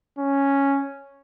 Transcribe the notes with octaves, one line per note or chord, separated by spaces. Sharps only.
C#4